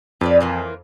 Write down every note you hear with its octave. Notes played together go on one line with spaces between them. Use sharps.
F2 F4 B4 D5
E3 A#3 F4